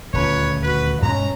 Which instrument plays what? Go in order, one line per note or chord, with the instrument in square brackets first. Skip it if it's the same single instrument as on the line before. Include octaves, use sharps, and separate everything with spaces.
[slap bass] D#1 D2 C#4 [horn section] F4 B4 C#5
[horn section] F#4 B4
[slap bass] G2 B2 G#3 [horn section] C#4 A#5